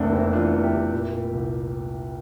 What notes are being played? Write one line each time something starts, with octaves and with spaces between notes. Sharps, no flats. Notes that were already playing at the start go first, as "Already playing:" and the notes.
Already playing: F1 E2 A3 A#3 C4 D4
F1 C4 E4
E3 D4 F4
E2
E4 G4
F1
A#2
A#2
C2